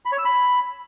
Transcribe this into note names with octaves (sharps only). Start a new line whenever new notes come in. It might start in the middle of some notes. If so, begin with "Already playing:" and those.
B5
C#5
E6
B5